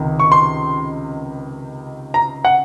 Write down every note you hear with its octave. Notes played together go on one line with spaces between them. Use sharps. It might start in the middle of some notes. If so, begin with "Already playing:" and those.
Already playing: C#2 C3 D#3
C#6
C6
A#5
F#5